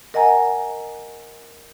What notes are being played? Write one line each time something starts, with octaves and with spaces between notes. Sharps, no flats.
A#4 D#5 F#5 G#5 A#5